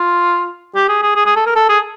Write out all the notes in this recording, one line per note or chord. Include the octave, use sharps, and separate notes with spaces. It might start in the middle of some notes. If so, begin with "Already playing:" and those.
Already playing: F4
G4
G#4
G#4
G#4
G#4
A4
A#4
A4
G#4